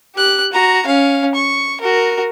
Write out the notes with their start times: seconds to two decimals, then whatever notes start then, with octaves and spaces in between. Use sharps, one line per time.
0.15 G4 F#6
0.52 F#4 A#5
0.86 C#4 F5
1.35 C#6
1.81 F#4 A#4